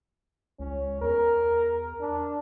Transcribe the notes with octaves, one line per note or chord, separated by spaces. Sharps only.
C#2 C#4
E2 A#4
D4